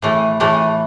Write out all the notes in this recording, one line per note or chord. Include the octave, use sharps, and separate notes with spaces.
A2 E3 A3
A2 E3 A3